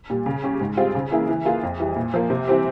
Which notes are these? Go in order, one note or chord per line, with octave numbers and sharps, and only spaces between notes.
A#2 G3
C#3
G3 C#4 G4
G#2
G3 C4 F4 G#4
C#3
E3 A#3 E4 G#4
E3
A#3 F4 G#4
F2
E3 G3
A#2
F3 A#3
C3
E3 G3 C4 G4